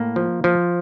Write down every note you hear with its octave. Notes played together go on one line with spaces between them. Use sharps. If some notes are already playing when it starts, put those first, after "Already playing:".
Already playing: A2 A#3
F3
F3